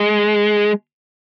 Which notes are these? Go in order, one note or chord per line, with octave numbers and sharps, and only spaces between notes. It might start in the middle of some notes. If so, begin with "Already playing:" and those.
Already playing: G#3